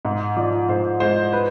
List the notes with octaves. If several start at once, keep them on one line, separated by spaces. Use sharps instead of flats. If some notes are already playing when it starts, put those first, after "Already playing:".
G#2
F3 D5
G#2 C5
G#3 C5
B4